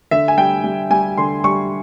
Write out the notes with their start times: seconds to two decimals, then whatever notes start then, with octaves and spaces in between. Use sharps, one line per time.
0.11 D3 E5
0.28 G#5
0.38 G3 G5
0.64 G3
0.90 G3 G#5
1.18 D3 C6
1.44 G3 C#6